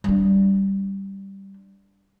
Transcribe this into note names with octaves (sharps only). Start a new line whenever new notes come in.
G3 D4